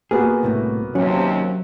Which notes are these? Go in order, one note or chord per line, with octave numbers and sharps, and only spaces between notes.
A#3 B3 F#4 G#4
C2 A2 C3
D#2 C3 F#3 C#4